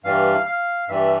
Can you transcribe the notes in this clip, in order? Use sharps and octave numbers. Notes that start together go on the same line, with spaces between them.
G2 E3 G3 F5
F5
G2 E3 G3 E5